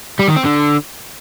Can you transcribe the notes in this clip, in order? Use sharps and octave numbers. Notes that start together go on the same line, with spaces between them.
G3
D#3
C4
D3